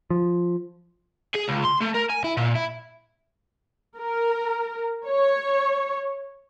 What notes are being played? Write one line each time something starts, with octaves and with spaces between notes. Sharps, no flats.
F3
G#4
C#2
C6
A3
A#4
G#5
E4
A#2
E4
A#4
C#5